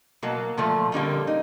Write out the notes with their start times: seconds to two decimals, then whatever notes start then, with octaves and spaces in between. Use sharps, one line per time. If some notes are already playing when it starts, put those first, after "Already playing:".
0.22 B2 F#3 A#3
0.57 A#2 F3 A3
0.92 F2 D3 G3 A#3
1.27 D#4